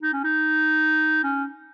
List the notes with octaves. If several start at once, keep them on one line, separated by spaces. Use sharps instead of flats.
D#4
C#4
D#4
C#4